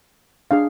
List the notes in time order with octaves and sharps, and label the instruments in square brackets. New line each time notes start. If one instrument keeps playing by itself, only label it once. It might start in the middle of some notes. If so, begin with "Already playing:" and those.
[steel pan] D4 G#4 F5